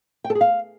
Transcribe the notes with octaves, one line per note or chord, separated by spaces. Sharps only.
G5
A4
G#4
F5